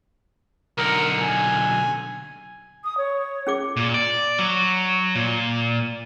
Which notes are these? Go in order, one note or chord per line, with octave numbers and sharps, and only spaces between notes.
B1 D3 A#4
G#5
D#6
C#5
C#4 G#4 D6
A#2
D5
F#3
A#2